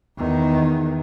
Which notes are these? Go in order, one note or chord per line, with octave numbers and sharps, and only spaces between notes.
E2 D#3